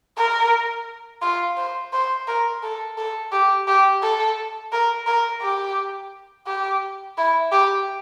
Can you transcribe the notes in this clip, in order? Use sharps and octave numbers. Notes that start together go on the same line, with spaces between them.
A#4
F4
C5
C5
A#4
A4
A4
G4
G4
A4
A#4
A#4
G4
G4
E4
G4